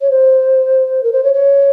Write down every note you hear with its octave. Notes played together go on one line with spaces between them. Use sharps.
C#5
C5
A#4
C5
C#5
C#5